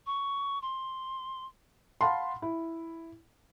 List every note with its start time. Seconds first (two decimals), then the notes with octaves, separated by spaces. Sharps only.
0.06 C#6
0.62 C6
2.01 F5 F#5 A5 B5 C6
2.42 E4